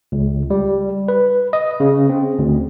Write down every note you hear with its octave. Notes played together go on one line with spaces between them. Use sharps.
C#2
G3
B4
D#5
C#3
C4
D2